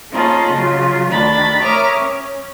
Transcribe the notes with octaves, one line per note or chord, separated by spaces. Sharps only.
A#3 C#4 D#4 F4 G#4 A4
C#3 F#3 F4
D2 D#3 D4 B5 A6
A#4 C#5 E5 D6 D#6 F6
C#4